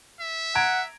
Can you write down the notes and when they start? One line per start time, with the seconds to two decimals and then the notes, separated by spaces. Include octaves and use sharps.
0.20 E5
0.55 F#5 A#5 G#6 D7